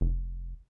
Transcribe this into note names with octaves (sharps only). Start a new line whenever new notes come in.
F1